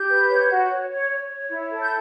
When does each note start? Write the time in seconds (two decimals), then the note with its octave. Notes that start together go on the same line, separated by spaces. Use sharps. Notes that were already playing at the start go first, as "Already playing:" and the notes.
Already playing: G4 G6
0.09 B4
0.30 C#5
0.49 F#4
0.70 C#5
0.90 C#5
1.10 C#5
1.30 C#5
1.50 E4
1.70 A4
1.82 G6